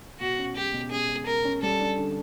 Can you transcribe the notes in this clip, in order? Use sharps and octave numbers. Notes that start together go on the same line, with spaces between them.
B2 F#4
C#4
G#3 G4
B2
C#4 G#4
G#3
G#3 A#4
C#4
G3 A4
D4
D3